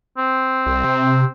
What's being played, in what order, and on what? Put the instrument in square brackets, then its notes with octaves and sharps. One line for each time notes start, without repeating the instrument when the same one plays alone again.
[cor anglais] C4
[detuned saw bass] C2
C3